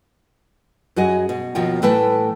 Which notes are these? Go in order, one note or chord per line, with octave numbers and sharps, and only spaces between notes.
F#2 F#4 G#4 D#5
B2
D#2 B2 D#3 F3 F4 G5
A2 E3 A3 B4 G5 A5